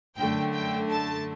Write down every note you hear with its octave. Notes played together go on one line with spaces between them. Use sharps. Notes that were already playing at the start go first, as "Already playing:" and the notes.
F#2 D3 A3 G5
G5
A5